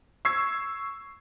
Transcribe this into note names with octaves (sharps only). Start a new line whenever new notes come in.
C#6 E6 G#6 C7